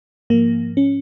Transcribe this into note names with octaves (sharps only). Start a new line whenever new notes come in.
G#2 F3 A#3
C#4